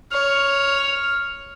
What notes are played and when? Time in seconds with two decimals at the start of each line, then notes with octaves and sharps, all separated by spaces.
0.12 C#5 F6